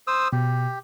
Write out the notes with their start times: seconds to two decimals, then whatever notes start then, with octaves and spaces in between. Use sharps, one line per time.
0.07 C5 D#6 E6
0.33 B2 G4